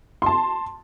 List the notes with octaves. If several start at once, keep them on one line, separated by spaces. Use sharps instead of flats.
A5 C6